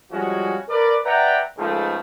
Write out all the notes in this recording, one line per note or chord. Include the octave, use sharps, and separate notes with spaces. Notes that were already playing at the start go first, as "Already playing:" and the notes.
F3 G3 G#3 C#4 F#4
A#4 B4 D5
B4 D5 E5 F#5 G5 A#5
C#2 G#2 C#3 F3 A3